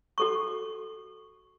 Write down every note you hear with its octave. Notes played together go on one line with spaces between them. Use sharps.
F#4 A4 C#6